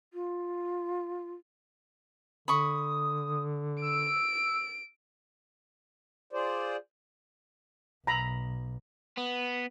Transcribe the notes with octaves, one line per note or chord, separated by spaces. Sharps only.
F4
D3 B5 C#6 D#6
E6 D7
F4 G#4 C5 D5
B1 A#5 B5
B3